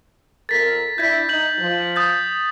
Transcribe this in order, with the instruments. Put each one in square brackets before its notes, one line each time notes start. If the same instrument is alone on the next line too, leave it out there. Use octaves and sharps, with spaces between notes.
[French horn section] F2 A4 A#4 [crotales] A6 B6
[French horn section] D4 E4 [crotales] G6 G#6 B6
[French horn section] D#4 [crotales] G6 F#7
[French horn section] F3
[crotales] D#6 G6 A6